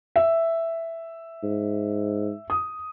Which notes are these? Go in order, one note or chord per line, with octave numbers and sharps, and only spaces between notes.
E5
G#2
D#6